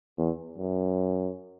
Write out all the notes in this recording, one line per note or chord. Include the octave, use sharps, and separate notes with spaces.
E2
F#2